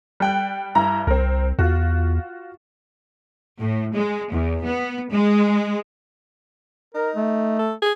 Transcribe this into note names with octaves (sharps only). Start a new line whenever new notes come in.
G3 G5 F#6
G2 E4 A#5
C2 C4 A#4
E2 F4 F#4
A2
G#3
E2
B3
G#3
D#4 A#4
A3
A4
G#4